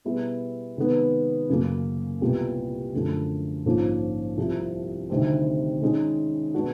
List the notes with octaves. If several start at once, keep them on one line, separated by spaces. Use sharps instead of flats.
B2 G3 B3 E4 G#4
C3 D#3 G#3 B3
F#2 C#3 F#3 A#3
C2 A#2 G3 B3
F#2 D3 F3 A3
A#1 G#2 F3 A#3 C#4
C2 C3 F3
D2 C3 D#3 G3 C4
D#3 G#3 C#4
B2 G#3 B3 D4 F#4